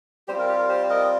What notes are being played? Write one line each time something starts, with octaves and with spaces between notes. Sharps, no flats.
G3 C4 F4 G4 C5
A#4
G4
A#4
G4 C5
A#4 D#5